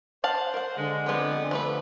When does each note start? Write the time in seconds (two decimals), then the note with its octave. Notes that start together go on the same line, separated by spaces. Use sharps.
0.24 C5 F5 F#5 A5
0.54 A#4 F#5
0.77 D3 G#3
1.06 F2 G#3 B3 G4 D5
1.51 F3 A3 B4